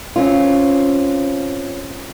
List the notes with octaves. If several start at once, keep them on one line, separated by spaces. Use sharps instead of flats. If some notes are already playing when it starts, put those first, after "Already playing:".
C4 C#4 F4